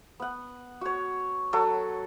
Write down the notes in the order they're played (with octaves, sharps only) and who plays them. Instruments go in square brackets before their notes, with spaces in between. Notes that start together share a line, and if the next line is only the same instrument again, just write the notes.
[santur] B3 F#5
F#4 C#5
F#3 A4 F#5